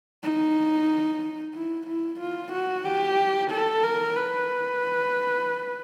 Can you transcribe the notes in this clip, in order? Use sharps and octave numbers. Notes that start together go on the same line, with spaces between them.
D#4
E4
E4
F4
F#4
G4
A4
A#4
B4